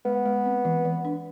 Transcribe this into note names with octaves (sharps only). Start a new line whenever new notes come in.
G#3 B3
G#3
C4
E3
E3
D4